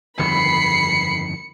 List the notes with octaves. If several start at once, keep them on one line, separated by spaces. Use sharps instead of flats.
G1 F2 D#3 B5 C7 C#7